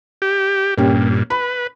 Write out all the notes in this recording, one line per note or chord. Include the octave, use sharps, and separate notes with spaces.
G4
G2 A#2 A#3 C#4 G4
B4 B5